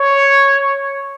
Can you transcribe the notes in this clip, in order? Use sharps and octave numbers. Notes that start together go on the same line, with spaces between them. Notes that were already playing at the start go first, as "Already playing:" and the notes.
Already playing: C#5